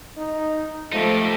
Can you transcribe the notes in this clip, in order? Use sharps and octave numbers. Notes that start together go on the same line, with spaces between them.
D#4
F3 A3 D#4 G4